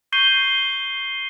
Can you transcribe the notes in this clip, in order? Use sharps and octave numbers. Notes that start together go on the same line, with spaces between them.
C#6 G6 C7 D#7 G7